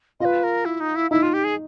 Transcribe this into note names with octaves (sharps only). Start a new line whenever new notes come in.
F4 B4 D#5
A#4
E4
D#4
E4
D#4 E4
F4
G4
G#4